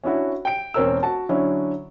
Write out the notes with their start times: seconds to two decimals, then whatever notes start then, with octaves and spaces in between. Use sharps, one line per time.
0.04 C#4 D4 E4 F#4
0.45 G5 D7
0.74 E1 C4 C#4 A#4 E6
1.03 F#4 A5
1.29 D3 F#3 C#4 D4 E4